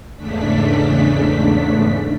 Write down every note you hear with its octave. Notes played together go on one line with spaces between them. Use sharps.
E2 G#2 C#3 A3 D4 B6